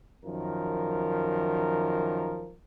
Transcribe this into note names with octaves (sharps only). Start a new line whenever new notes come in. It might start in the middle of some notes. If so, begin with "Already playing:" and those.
F#2 D#3 F3 A#4